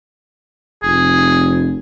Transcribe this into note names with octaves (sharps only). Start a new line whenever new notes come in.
F1 G#4